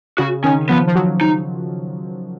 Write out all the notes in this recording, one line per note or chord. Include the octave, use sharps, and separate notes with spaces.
C#3 F#4
D#3 C#4
F3 B3
F3
F#3
D#4